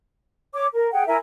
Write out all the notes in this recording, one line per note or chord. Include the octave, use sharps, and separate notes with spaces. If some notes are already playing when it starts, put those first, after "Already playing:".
C#5 D6
A#4
G#4 F#5 G5
E4 A#4 E5 G#5